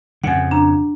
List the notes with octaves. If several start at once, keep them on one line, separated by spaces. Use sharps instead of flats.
F2 C#3 F#5 G#5
D4 A#5